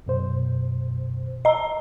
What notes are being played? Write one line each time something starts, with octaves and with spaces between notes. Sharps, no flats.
F#2 B2 C5
D#5 A#5